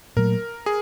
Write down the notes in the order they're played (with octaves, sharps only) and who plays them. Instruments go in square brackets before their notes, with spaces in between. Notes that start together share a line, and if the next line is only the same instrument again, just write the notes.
[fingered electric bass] A#2 F#3 A3 [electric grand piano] A#4
[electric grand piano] G#4